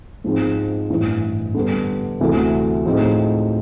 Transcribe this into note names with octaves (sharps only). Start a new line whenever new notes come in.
G#2 F3 G#3 C4
A1 G2 E3
D3 G3 B3
D2 C3 E3 A3
A2 F3 G#3 C4 D#4